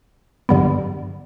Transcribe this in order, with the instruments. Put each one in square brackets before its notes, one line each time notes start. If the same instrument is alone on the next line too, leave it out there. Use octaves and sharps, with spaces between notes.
[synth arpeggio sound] G2 D3 F#3 B3